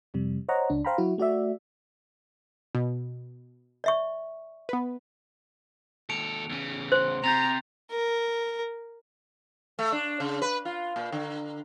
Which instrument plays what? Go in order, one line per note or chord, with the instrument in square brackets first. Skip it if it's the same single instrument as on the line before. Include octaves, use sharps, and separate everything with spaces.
[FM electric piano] F2 C3 G3
C5 C#5 D#5 F#5 A#5
C#2 D4
C5 F5 G5 A#5 B5
F#3 E4 F#4
A3 F#4 D5 E5
[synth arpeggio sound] B2
[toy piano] D5 E5 C#6
[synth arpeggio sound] B3 B4
[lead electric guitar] D#2 A4 [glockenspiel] C#7 D7 F7
[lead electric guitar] E2 C#3
[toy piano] C5 [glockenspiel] C6
[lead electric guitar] C3 [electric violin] A#5 [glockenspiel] G6 A6 F7
[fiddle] A#4
[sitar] A3
D4
C#3
B4
F4
A#2
D3